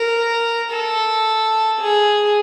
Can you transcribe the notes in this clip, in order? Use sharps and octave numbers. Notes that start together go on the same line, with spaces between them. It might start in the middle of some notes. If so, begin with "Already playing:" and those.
Already playing: A#4
A4
G#4